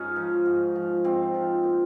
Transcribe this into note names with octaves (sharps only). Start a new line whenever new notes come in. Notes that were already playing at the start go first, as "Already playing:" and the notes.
Already playing: G#2 C#4 D#4 F4
F3
G#2
F3
G#2 C4
F3
A#2